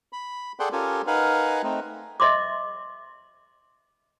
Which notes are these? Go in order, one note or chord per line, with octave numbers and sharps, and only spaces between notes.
B5
G#4 A4 D5 F#5 G5 C6
C#4 F4 G4 A4 A#4 G#5
D#4 A#4 B4 F5 F#5 G#5
A3 C4 D#4
D#5 E5 C6 D6